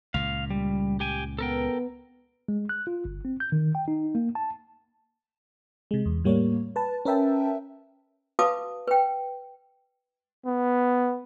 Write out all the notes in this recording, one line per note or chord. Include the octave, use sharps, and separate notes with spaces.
C#2 A#2 F5
G3
G4 G5 G#5
B3 A4 A#4 G5
G#3
F#6
F4
G1
C4
G6
D#3
G5
D#4
A#3
A5
C3 G#3
E2
A2 G3 A#3 C#5
B4 A5
C#4 A#4 B4 E5 G5 A5
F#4 B4 F5 A5 D6 D#6
B4 G5
B3